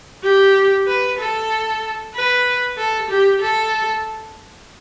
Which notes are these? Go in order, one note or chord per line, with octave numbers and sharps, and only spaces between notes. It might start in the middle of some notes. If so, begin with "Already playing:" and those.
G4
B4
A4
B4
A4
G4
A4